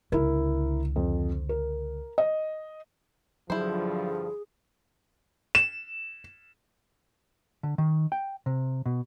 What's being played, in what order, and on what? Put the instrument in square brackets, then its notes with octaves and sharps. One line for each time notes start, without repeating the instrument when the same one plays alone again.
[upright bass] C#2 D3 [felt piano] E4 A#4
[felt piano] F2
A#4
D#5
[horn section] G2 D3 F3 [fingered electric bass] F#3 [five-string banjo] E4 C5 [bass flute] G#4
[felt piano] E7
[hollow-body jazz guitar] D3
D#3
G5
C3
B2